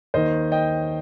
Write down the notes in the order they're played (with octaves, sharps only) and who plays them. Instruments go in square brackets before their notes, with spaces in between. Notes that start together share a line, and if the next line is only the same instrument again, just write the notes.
[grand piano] D#2 D#3 C5 D#5
D#5 G5